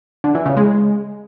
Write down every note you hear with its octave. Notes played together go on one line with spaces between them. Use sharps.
D3
E3
C#3
G#3